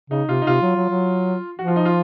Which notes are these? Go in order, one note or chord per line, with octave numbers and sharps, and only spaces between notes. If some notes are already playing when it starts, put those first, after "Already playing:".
C#3 D#4
C3 F4
D#4
C3 F4
F#3
F#3
F#3
F3 F#4
F4
D#4
F4